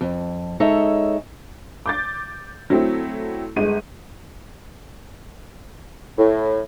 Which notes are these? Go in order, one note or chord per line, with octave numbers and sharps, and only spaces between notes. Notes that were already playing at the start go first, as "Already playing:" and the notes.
F2
G#3 D#4 A4 C#5 D#5 E5
D6 G6 A6
F#3 A3 C4 E4
G1 G#3 D#7
A2